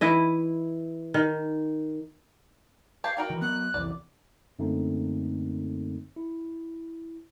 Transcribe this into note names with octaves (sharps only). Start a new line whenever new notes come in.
E3 E4 D#5
D#3
G4 F5 G#5 A5
F#4 A#4 D5 G5
D#3 E3
F#3 B3 F#6
C2 F2 E3 D5
F#2 D3 A3 A#3 C4 D#4
E4